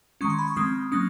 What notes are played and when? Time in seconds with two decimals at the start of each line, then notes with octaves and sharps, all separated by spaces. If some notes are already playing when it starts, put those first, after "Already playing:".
0.21 D#3 G#3 C#4 C#6
0.30 C6
0.38 B5
0.48 C#6
0.56 F3 G#3 C4 D#6
0.92 F#3 A#3 C#4 D#6